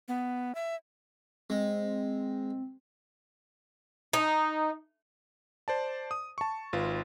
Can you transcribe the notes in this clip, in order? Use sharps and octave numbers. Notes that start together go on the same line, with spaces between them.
B3
E5
G#3 C4
D#4
C5 D5 A5
D#6
A5 C#6
G#1 F4 B4